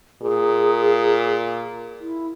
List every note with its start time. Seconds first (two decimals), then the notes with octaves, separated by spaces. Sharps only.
0.22 A#2 G#4
2.01 E4